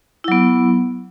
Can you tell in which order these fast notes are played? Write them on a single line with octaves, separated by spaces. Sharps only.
E4 F#3 B3